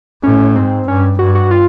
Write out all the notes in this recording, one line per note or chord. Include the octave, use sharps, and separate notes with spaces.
A2 C#4
G#2 C4
G2 C#4
G2 F#4
F#4
F4